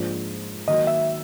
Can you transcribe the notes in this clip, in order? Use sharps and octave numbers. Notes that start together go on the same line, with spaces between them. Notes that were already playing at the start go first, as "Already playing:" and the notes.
Already playing: G#2 F3 A#3 D4
D#3 F#3 A#3 D#5
E5